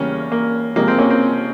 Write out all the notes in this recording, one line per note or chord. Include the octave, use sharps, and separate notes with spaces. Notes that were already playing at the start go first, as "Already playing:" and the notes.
Already playing: E2 C#3 G3 A#3 C#4
A#3
F2 C3 F3 G#3 A#3
C4
A#3 C#4
C4